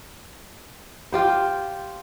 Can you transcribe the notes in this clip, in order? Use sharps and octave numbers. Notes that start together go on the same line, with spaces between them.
F4 G4 C5